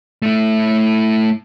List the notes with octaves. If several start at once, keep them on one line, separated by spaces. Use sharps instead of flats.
A3 E4